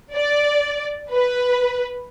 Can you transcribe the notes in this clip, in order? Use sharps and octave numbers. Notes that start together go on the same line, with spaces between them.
D5
B4